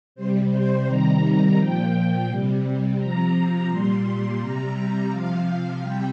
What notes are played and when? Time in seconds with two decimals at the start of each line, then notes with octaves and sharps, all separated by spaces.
0.15 C3 G3 C5
0.51 C5
0.86 C3 D#3 G3 A#5
1.58 A#2 F3 G5
2.27 C3 G3
2.98 C3 F3 A#5
3.68 A#2 G3 C6
4.40 C3 G3 A#5
5.10 C3 F3 F5
5.80 C3 G3 G5